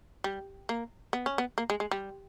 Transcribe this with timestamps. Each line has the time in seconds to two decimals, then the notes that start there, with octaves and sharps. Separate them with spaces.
0.24 G3
0.69 A#3
1.13 B3
1.26 C#4
1.38 B3
1.58 A#3
1.70 G#3
1.80 G#3
1.91 G3